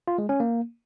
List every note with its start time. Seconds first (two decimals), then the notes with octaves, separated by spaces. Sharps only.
0.08 F4
0.18 G#3
0.29 C#4
0.40 A#3